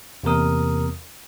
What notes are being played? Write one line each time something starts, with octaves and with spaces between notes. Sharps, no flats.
E2 C3 A#3 A#4 D#6